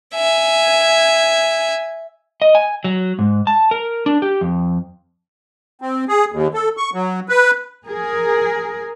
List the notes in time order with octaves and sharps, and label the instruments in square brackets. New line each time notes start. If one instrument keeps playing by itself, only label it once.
[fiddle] E5 G#5
[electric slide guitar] D#5
G#5
F#3
G#2
A5
A#4
D4
G4
F2
[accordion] C4
G#4
D#2
A4
C#6
F#3
B4
[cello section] G#4 A#4